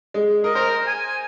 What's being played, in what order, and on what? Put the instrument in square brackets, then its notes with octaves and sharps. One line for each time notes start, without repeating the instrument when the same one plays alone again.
[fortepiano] G#3
[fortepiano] A#4 [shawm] D#5
[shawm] A#4 [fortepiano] C5
[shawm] G#5